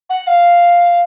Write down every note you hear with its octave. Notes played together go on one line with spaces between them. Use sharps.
F#5
F5